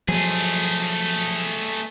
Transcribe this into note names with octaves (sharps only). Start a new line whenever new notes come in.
F3 F#3 A3 G#4